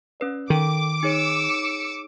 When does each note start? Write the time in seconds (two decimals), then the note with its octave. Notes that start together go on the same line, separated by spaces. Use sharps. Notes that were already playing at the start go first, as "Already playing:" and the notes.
0.20 C#4 B4 D5
0.50 D#3 A4 G5 D6
1.03 D#4 G#4 C#5 E6 C#7